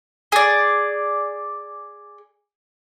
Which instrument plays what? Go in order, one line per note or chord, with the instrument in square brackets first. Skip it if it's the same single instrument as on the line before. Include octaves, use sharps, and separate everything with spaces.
[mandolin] G#4 D5